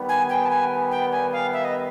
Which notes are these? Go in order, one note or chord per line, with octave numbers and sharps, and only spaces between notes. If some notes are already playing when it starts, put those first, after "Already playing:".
Already playing: D#3 G3 B3
G#5
G5
A5
G#5
G5
G#5
F5
E5
D#5